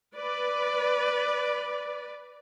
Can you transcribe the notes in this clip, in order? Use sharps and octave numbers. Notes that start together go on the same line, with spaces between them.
B4 D5